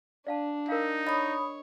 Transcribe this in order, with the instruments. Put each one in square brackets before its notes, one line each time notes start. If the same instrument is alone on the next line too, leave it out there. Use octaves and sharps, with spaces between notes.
[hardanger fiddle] D4 [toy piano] D5 F5 A5
[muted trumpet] D#4 [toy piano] A#4 F5
[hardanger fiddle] C#5 [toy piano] D#5 [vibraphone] B5 D#6